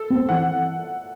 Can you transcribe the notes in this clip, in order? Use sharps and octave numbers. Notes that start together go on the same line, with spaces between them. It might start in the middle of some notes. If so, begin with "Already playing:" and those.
Already playing: A4
C4
E3 F#5